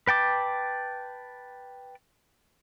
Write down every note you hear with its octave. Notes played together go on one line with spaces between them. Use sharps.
B4 G5 A5 D6